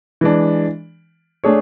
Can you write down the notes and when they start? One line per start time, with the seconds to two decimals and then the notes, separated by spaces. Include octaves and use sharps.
0.21 E3 G#3 D4
1.44 A3 D4 G#4 C#5